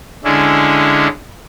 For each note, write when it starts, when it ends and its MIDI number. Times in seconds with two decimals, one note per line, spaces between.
0.24 1.08 50
0.24 1.08 56
0.24 1.08 61
0.24 1.08 62
0.24 1.08 64